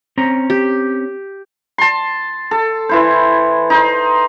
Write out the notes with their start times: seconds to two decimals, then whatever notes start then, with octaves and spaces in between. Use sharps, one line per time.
0.17 C4 C#4 A#5
0.50 G4
1.78 A5 C6
2.51 A4
2.89 E3 E4 C5
3.70 D#4 C5